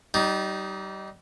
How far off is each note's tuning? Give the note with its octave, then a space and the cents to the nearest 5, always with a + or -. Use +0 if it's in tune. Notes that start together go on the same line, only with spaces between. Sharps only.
G3 -30 D#4 +0